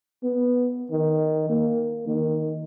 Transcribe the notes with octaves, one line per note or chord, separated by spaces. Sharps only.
B3
D#3
A#3
D#3